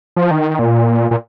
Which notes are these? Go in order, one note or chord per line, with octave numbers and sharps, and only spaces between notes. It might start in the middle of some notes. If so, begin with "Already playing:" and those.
F3
D#3
A#2
A#2